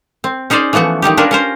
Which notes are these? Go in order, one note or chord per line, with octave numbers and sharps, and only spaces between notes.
C4
C#4 D#4 G#4 C5 D5
E3 F3 A3 B3 F#4
D#3 G3 D#4 G4
C#4 D4 F4 A#4 B4
C#4 A#4 C5